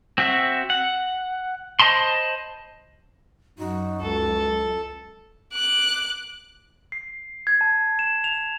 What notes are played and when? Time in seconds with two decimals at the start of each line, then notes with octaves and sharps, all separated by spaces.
0.18 C4 F#4 E5
0.70 F#5
1.80 C5 D#5 A5 B5 C6
3.59 F#2 D#4 F#4
4.02 C#2 A4
5.53 D6 F#6
6.92 C7
7.47 G#6
7.61 A5
7.99 E7
8.24 F7